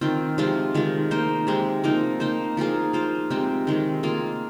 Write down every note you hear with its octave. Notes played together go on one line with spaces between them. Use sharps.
D#3 C4 F4
C3 F3 G#3 F4
D#3 G#3 F4
A#3 D#4 C5
C3 G#3 C4
F3 A#3 D#4
A#3 D#4 C5
F3 A#3 F4 G#4
A#3 F4 C5
C3 G#3 C4
D#3 G#3 C4
A#3 F4 G#4